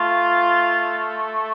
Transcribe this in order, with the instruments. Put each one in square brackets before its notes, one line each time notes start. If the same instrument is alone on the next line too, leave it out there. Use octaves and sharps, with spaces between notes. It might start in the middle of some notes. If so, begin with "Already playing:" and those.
Already playing: [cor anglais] A3 [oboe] F4